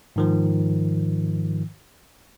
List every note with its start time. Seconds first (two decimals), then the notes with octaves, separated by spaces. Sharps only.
0.16 G#2 D#3 F3